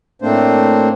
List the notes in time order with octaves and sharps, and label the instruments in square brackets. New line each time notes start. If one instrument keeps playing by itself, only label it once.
[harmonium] A2 A3 A#3 C4 D4 C5